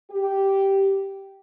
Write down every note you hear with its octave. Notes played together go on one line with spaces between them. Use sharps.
G4